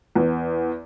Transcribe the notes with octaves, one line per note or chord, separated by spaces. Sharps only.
E2